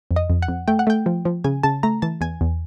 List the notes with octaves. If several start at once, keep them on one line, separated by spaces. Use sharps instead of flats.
F2
D#5
F2
F#5
F2
A3 G5
F#5
A3 G5
F3
F3
C#3 G#5
C#3 A5
A3 A#5
E3 A5
E2 G#5
E2